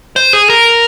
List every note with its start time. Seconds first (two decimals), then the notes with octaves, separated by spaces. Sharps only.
0.16 C5
0.33 G#4
0.50 A#4